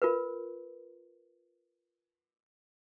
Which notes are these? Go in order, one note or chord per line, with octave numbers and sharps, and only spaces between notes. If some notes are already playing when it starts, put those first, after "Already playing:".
F4 A#4 B4